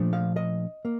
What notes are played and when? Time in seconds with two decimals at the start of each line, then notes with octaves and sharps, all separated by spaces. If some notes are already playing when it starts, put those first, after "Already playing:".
Already playing: A#2 F3 A3 D4
0.13 F5
0.36 D#5
0.85 A#3